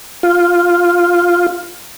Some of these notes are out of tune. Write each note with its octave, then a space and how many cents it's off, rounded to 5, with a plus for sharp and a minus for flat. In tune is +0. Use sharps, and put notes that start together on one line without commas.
F4 +5